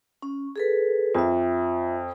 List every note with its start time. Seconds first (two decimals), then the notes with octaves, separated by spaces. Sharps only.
0.22 C#4
0.56 G#4 A4 B4
1.15 F2 F4 E5